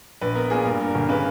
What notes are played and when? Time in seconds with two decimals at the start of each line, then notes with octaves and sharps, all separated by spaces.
0.21 A#1 B4
0.35 B3 A#4
0.50 A#2 G#4
0.65 G2 A#4
0.80 G2
0.87 A#4
0.95 G1
1.09 C#3 B4